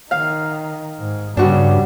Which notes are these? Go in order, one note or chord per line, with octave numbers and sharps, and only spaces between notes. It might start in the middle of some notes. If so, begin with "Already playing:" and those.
D#3 F5
G#2
G2 C#3 G3 D4 F#4